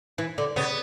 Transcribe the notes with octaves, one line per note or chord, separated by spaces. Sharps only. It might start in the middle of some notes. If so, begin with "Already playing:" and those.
E3
D3
C#3 B3